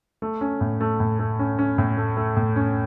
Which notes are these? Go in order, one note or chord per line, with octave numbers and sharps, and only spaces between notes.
A3
C#4
A2
A3
A2
A3
C#4
C#4
A2
A3
A3
A2
C#4